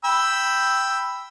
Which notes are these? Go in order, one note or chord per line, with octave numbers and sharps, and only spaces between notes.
G5 B5 E6